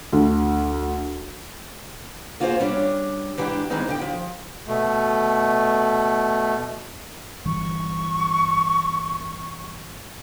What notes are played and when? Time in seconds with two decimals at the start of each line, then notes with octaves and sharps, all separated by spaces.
0.13 D2
2.40 A#3 F4 F#4 G#4 B4 C5
2.60 G3 C#4 D4
3.38 G#2 E3 D4 G4
3.70 D#3 E3 G3 G#3 C4 D#4
3.88 D3 G5
4.01 F3
4.68 B2 A3
7.45 G1 E3 C#6